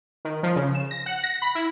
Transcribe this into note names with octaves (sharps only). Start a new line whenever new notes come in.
D#3
F3
C#3
E7
A#6
F#5
A#6
B5
E4